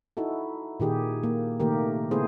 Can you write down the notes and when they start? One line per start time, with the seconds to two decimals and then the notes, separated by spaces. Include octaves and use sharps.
0.17 D#4 E4 F#4 A4
0.80 A#2 D#3 G4 G#4
1.23 A#3
1.60 C3 D#3 A3 A#3 G4 A#4
2.11 C#3 A3 B3 E4 G#4 C5